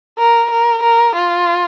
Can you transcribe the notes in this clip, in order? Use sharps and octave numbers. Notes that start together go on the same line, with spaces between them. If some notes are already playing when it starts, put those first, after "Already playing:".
A#4
A#4
A#4
F4